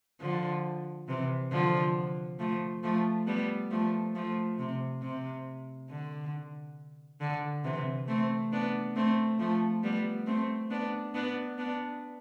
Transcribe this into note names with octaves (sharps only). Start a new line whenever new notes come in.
D3 F3
C3 E3
D3 F3
F3 A3
F3 A3
G3 B3
F3 A3
F3 A3
C3
C3
D3
D3
C3 E3
A3 C4
B3 D4
A3 C4
F3 A3
G3 B3
A3 C4
B3 D4
B3 D4
B3 D4